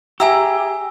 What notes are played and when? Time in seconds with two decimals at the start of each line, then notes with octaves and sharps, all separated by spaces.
0.20 E4 G4 G#4 G#5 A#5 E6